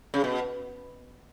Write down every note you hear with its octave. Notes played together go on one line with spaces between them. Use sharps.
C#3
B2